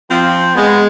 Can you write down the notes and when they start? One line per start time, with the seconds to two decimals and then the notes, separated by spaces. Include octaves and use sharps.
0.10 F3 C4
0.55 G#3 B3